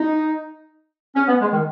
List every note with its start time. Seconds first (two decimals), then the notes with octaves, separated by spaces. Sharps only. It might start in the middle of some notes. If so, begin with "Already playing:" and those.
Already playing: D#4
1.16 C#4
1.27 B3
1.40 G#3
1.52 D#3